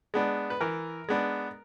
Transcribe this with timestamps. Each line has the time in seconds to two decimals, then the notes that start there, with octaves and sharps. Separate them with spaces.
0.14 G#3 B3 D4
0.50 B4
0.61 E3 A#4
1.09 G#3 B3 D4